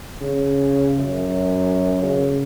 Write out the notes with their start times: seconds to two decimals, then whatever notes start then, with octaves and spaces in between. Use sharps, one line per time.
0.21 C#3
0.99 F#2
2.03 C#3